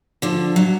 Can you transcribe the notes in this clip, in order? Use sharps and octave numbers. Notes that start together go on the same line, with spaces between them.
D3 F3
F#3